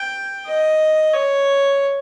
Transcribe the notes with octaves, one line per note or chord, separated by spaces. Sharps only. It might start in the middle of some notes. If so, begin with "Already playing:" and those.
Already playing: G5
D#5
C#5